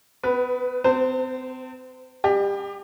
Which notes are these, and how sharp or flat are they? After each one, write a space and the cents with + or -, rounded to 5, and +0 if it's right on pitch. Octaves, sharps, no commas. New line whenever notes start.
B3 +30 B4 +0
C4 -35 C5 -15 A5 +40
G3 +20 G4 +20 D5 +45